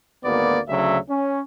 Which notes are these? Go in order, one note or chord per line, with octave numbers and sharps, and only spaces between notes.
G#1 D2 A#3 B3 D5
D2 C#3 F#3 E5
C#4